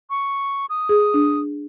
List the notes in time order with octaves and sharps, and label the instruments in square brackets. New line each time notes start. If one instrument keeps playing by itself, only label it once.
[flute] C#6
D#6
[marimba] G#4
D4